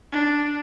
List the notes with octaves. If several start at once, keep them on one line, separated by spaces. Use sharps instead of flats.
D4